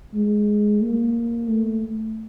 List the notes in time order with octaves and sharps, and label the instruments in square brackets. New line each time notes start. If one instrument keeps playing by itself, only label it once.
[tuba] G#3
A#3
A3